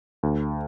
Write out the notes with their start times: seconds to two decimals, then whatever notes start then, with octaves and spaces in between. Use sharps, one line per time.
0.23 D2